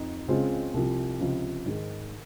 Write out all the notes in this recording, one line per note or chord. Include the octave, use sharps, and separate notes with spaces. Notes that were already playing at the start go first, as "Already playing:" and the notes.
Already playing: F2 D#4
C#2 C#3 G#3 C4 F4
C2 C3 F3
C#2 C3 F3
G#2 D#3 G#3